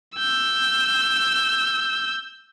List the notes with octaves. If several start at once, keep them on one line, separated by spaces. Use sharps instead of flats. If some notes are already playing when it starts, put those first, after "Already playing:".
E6 G6